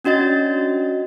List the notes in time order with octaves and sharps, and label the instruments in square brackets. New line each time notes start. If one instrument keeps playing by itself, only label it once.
[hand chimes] C#4 D4 F#4 D#5 A6